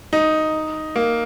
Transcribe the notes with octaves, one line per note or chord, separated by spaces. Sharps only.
D#4
A#3